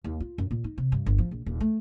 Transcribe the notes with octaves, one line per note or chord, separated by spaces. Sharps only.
D#2
F4
F#2
A#2
D#4
C3
G2
G1
F3
A#1
D#1
A3